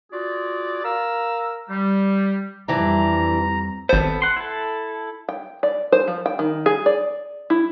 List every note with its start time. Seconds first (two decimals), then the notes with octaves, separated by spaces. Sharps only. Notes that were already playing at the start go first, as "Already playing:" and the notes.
0.12 F4 F#4 G#4 D5
0.84 A#4 F5 A#5 E6
1.69 G3
2.68 F2 E3 G3 C4 D4 A#5
3.89 G#1 B3 A4 C5
4.22 F#5 C6
4.37 E4 A4
5.29 G5
5.63 D5
5.92 C5
6.08 F3
6.26 G5
6.39 D#3
6.66 G#4
6.86 D5
7.50 E4